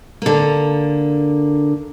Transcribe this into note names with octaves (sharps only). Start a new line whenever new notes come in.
D3 A#3